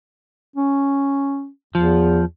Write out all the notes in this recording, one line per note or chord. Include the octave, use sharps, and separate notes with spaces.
C#4
E2 F3